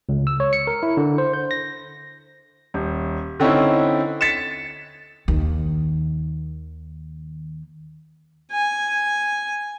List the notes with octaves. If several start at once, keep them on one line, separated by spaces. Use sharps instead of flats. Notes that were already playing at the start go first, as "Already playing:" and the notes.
C#2
E6
C#5
C#7
A#4
E4
D3
C5
G6
A#6
D#1
D3 C4 C#4 D#4 E4
A6 B6 C#7 E7
D#2 D#3
G#5